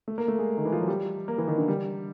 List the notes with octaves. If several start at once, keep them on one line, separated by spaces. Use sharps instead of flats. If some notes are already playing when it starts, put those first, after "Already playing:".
A3
A#3
A3
G#3
D#3
E3
F3
F#3
G3
A#3
E3
D#3
D3
G3